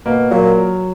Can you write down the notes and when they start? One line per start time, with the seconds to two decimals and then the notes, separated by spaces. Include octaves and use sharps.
0.06 B2 A#3
0.31 A#2 F#3